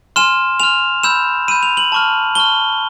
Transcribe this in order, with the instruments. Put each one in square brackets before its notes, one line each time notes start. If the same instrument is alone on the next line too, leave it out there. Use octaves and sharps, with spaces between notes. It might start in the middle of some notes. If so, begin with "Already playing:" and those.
[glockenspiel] G#5 C6 F6 E7
G#5 C6 F6 F7
B5 E6 G6 E7
B5 E6 G6 D#7
F7
F#7
A5 C#6 F6
A5 C#6 F6 G7